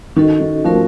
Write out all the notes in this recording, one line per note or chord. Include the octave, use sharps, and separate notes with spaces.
D#3 C#4 F#4 A4 D#5
D#3
F3 A3 C#4 F#4 A#4